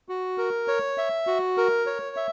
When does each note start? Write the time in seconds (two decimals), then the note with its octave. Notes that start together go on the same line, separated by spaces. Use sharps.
0.09 F#4
0.38 A#4
0.68 C#5
0.98 E5
1.27 F#4
1.57 A#4
1.86 C#5
2.16 E5